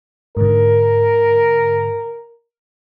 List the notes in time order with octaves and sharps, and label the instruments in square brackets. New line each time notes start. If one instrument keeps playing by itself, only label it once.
[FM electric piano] G#2 D3 [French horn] A#4